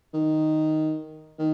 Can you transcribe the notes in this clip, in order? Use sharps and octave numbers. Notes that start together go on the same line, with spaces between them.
D#3
D#3